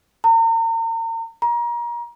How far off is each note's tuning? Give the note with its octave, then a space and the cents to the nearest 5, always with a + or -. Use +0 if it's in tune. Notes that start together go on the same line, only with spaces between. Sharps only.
A#5 -40
A#5 +30